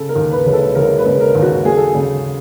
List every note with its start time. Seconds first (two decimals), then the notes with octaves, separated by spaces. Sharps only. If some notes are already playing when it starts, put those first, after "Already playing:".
Already playing: C#3 A4
0.09 A#4
0.16 D#2
0.32 B4
0.46 E1
0.53 A4
0.75 E1 A#4
0.98 B4
1.06 C#3
1.21 A#4
1.35 D#2
1.42 F#4
1.65 F#3 G#4
1.77 A4
1.89 G#4
1.94 C#3